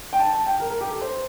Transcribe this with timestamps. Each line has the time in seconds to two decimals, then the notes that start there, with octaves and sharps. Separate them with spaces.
0.13 G5
0.19 A5
0.33 A5
0.46 G5
0.60 A#4
0.70 A#4
0.81 G4
0.90 A4
1.01 C5